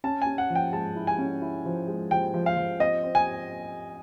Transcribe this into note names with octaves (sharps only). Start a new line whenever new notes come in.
C#4 A5
C#4 G#5
F#5
F3
G5
G#3 A5
E4
G#5
C#4
E4
F3
G#3
F3 G5
F3
F5
F3
C4 D#5
C4
G#5